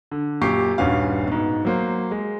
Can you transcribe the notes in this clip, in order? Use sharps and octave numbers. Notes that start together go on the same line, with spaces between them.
D3
F#2 A#2 G4 C#6 C7
D#1 G2 C#4 F#4 F5
G#2 B2
F#3 A#3 C5
G#3